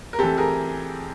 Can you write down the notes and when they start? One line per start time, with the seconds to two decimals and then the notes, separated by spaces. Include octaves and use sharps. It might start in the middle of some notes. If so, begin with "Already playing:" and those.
0.13 A#4
0.19 E3 A3 C4 G4 A4
0.37 G#4 A#4